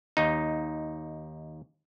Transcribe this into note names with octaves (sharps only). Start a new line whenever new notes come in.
D#2 D#4